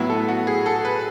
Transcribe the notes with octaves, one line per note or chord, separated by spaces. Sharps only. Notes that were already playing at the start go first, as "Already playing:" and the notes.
Already playing: A2 F#3 B3 E4
A4
F#4
G#4
A4
B4